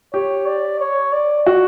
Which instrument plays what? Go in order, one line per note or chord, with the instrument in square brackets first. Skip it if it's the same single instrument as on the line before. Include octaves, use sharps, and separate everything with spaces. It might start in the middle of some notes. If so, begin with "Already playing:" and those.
[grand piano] G4 [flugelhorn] C#5
[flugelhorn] D5
C#5
D5
[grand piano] F#4